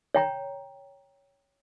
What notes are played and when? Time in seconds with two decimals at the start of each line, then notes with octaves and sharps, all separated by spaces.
0.15 C#5 G5 A#5